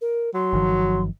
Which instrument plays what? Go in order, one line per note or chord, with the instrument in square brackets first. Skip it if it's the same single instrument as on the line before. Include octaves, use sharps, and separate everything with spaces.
[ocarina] A#4
[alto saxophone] F#3 [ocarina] C6
[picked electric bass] G1 D#3 F3